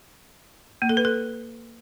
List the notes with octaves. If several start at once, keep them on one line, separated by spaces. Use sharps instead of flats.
A#3
A4
B4
A4